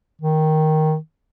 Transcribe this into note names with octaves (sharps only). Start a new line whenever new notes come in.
D#3